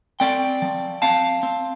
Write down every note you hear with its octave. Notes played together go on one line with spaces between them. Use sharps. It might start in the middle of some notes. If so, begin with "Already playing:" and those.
C4 D5 G5
F3
C4 F5 A5
C4